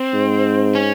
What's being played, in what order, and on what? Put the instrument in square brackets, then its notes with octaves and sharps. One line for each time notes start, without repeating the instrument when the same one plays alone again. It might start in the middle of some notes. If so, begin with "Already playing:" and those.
Already playing: [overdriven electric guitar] C4
[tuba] G#2
[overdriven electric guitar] C#4